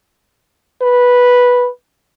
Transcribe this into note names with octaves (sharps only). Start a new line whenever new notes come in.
B4